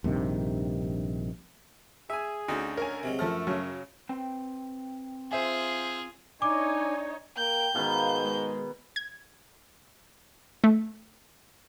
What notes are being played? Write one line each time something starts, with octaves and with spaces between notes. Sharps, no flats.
A#1 G2 C3 D#3
G#4 E5 G#5
D2 D3 C#4 D#4 F#4
A#4 C#5 G#5
C3 F#3 G#3
F#2 F3 A3 A4 A#5 F6
C#3 F#3
C4 B4 G5
F4 G#4 C5 E5 G#5
D4 D#4 C#5 G#5 D6
A#3 G5 G6
G#2 B2 D#3 F5 B5
G#3
G#6
A3